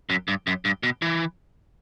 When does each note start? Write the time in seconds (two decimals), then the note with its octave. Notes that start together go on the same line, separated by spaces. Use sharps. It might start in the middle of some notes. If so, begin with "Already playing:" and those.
0.10 F#2
0.28 G2
0.47 F#2
0.65 G2
0.83 B2
1.02 E3